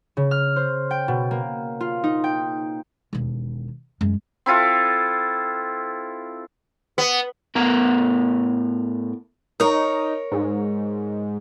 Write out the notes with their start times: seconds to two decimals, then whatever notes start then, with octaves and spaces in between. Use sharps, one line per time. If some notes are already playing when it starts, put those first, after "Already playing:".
0.17 C#3
0.31 F6
0.56 C5
0.91 G5
1.08 B2
1.31 A#3
1.81 F4
2.04 D#4
2.24 G5
3.13 E1 D#2
4.01 F#2 G#3
4.46 C4 E4 F4 A4
6.98 B3
7.55 A2 B3 A#4 A#5
9.60 D#4 A#4 C#5
10.32 G#2